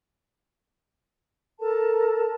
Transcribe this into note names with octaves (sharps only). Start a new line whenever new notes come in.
A4 A#4 A5